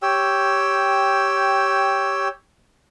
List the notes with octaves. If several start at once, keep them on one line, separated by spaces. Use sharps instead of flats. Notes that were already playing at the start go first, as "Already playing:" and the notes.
G4 C#5 G5 E6